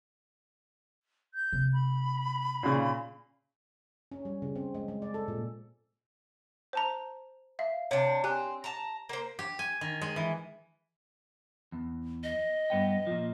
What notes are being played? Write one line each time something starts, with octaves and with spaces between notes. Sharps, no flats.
G6
C3
B5
A#2 C#3
C#4
G3
C#3
C4
G#3
G#3
D5
A4
A#2
C5 A5 A#5
E5 F5
C3 D4 C#5
C4 G4 G#5 F#6
A5 A#5
A#3 C5
G4
G#5
D#3
G#3
E3
E2
D#5
G2 B3 G5
A#2 F3